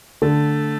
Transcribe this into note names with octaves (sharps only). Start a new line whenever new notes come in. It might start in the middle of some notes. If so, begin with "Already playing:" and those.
D3 A3